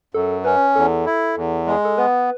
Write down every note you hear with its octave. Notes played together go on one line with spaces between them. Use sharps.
F#2 A4
C#4 B4
E2 A4
E4
E2
G#3
G#4
A4
B3 B4